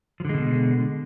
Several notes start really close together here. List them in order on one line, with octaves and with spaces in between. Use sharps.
F3 D3 G#3 B2